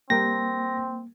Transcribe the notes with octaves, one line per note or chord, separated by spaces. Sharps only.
G3 A#3 C4 A#4 G5 A#6